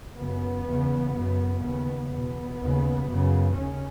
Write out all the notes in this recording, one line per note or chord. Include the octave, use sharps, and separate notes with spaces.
F#2 C#3 B3
E2 C#3
F#2 C#3
D#2 C#3 B3
E2 B2 B3
D#2 C#3
F#2 C#3
D#2 C#3 C#4